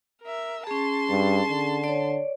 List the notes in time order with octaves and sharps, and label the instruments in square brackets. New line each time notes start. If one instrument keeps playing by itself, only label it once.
[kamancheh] A#4 E5
[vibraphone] C#4 G#4 [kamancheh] A5 C6
[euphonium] G2
D3
[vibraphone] C#5 D5